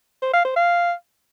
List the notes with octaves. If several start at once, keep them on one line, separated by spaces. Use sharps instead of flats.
C5
F5
C5
F5